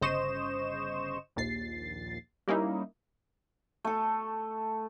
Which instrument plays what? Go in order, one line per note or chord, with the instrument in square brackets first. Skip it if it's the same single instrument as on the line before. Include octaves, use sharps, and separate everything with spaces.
[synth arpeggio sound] G1 C#3 C5 D#5 C#6 E7
A#1 D#2 A#2 A6 C7
G3 A#3 C#4 D#4 E4
[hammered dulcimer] A3 A4